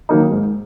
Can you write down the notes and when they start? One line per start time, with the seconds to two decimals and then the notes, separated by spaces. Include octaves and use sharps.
0.09 D#3 F#3 A#3 D#4
0.31 G#2